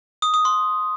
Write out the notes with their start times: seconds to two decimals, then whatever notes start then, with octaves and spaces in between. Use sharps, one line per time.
0.22 D#6
0.34 D#6
0.45 C6